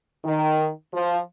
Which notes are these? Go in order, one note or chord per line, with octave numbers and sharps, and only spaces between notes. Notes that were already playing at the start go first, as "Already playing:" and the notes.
D#3
F3